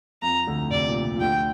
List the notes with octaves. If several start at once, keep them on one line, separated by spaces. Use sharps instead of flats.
F2 F3 A#5
D2 D3
C3 D5
A#2
C3
F3
D2 D3 G5